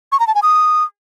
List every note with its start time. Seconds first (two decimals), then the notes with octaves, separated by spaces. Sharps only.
0.12 C#6
0.20 A#5
0.27 A5
0.35 G#5
0.43 D#6